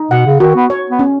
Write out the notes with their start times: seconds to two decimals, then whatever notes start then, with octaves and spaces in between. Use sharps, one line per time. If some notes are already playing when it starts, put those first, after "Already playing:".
Already playing: D#4
0.11 B2 F#5
0.26 C#3
0.40 D#3 F#4
0.56 B3
0.70 C#5
0.90 B3
0.99 C#4